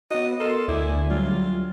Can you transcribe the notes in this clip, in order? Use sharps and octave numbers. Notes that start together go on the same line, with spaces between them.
B3 F#4 D#5
A4 A#4 D#5 C6
D2 E4 D5 G#5
F#3 G3 F4